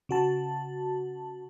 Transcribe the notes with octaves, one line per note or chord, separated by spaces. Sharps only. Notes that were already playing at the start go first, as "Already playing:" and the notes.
C#3 F#4 A5